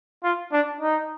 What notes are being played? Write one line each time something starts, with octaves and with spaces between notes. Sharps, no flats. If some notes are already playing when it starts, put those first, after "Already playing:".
F4
D4
D#4